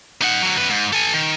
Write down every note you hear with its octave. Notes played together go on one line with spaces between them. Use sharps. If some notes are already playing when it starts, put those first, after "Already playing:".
D#4 F#5
D3 F#3
F#2 B4
G#2
A4 G#5
D#3